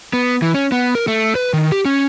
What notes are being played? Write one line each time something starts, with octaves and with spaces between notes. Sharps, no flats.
B3
E3
C#4
B3
A#4
A3
B4
D#3
G4
C#4